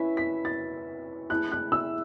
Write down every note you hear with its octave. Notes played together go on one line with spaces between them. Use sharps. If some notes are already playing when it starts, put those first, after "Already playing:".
Already playing: C#4 E4 B4 E5 B6
B6
A6
A3 E4 G#4 F#6
F#6
E6